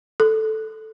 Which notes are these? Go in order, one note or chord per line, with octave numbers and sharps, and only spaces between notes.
A4